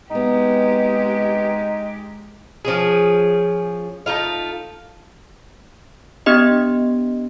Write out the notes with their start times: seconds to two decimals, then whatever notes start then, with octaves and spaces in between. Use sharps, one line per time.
0.11 C3 G#3 B3 D#4 G4
2.65 F3 C#4 G#4
4.06 A3 D#4 F4 F5
6.26 B3 D4 G4 D#5